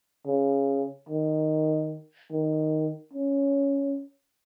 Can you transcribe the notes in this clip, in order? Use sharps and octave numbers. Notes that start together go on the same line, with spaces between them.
C#3
D#3
D#3
C#4